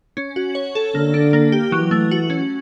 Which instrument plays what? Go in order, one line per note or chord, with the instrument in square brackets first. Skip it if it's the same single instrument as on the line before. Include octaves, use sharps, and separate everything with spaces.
[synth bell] C#4
F#4
C#5
A4
[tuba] D3 [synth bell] A#3
[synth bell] D4
A#3
G4
[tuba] E3 [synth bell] F#3
[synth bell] A3
F#4
C#4